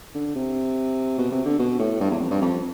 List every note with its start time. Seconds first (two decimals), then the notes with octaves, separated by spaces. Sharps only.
0.14 D3
0.35 C3
1.18 B2
1.32 C3
1.45 D3
1.59 B2
1.79 A2
2.00 G2
2.10 E2
2.21 F2
2.31 G2
2.41 F2